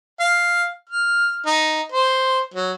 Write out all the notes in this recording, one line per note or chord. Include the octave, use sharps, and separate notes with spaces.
F5
F6
D#4
C5
F#3